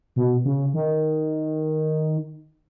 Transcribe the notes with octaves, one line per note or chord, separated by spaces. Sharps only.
B2
C#3
D#3